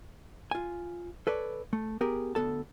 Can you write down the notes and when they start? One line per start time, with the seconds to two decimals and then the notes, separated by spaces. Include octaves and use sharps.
0.51 F4 G#5
1.27 A4 B4 C#5 D5
1.73 A3
2.01 B3 G4 G#4 A#4
2.35 D2 F3 B3 A4 A5